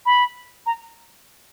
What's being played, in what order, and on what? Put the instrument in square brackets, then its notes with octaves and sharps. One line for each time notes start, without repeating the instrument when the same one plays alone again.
[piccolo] B5
A#5